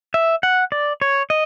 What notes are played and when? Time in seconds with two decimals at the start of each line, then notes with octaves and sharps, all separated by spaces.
0.14 E5
0.43 F#5
0.72 D5
1.02 C#5
1.30 D#5